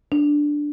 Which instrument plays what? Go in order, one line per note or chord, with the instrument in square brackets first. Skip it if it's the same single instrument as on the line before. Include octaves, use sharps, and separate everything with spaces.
[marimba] D4